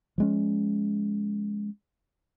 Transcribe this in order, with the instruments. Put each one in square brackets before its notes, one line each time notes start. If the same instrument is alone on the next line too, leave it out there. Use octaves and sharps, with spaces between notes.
[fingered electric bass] F3 G#3 C#4